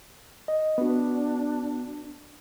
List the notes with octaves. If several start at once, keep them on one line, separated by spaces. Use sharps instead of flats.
D#5
B3 D4 F#4